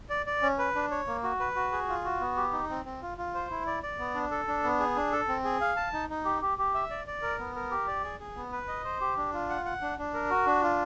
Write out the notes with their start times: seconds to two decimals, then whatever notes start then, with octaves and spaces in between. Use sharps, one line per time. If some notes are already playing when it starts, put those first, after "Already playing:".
0.10 D5
0.26 D5
0.42 C#4
0.58 B4
0.75 D4
0.91 C#5
1.07 A#3
1.23 F#4
1.40 B4
1.56 F#4
1.72 G#4
1.88 F4
2.04 F#4
2.20 B3
2.37 G4
2.53 D#4
2.70 C4
2.85 C4
3.02 F4
3.18 F4
3.34 C5
3.51 E4
3.67 D5
3.83 D5
3.99 B3
4.15 D4
4.31 A4
4.47 D4
4.64 B3
4.80 G#4
4.96 D4
5.12 A4
5.29 C4
5.44 G#4
5.61 F5
5.76 A5
5.93 D#4
6.10 D#4
6.25 G4
6.42 G4
6.58 G4
6.74 E5
6.90 D5
7.07 D5
7.22 A#4
7.39 B3
7.55 A#4
7.71 G4
7.87 D5
8.04 G#4
8.20 G#4
8.36 B3
8.52 B4
8.68 D#5
8.85 C5
9.01 G4
9.17 D4
9.34 F4
9.49 F#5
9.66 F#5
9.81 D4
9.98 D4
10.14 A#4
10.30 F#4
10.46 D4
10.62 F4